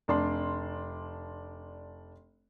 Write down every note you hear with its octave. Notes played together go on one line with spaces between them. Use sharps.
F1 D4 C6